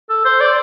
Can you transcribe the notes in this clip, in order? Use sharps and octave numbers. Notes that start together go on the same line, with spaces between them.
A4
C5
D5